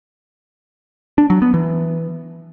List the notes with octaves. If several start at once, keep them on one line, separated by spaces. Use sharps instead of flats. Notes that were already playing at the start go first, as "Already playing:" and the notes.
D4
F#3
B3
E3